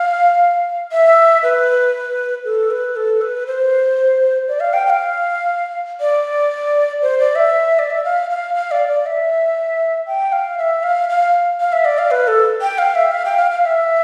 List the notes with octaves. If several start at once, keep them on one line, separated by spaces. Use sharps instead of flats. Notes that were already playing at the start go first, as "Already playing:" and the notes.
Already playing: F5
E5
B4
A4
B4
A4
B4
C5
D5
F5
G5
G5
F5
D5
C5
D5
E5
D5
E5
F5
F5
F5
D5
D5
E5
G5
F5
E5
F5
F5
F5
E5
D5
F5
B4
A4
G5
F5
E5
F5
G5
F5
F5
E5